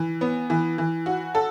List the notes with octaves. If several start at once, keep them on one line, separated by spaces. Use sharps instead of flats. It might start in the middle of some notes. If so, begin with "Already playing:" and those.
Already playing: E3
B3
E3
E3
F#4
A4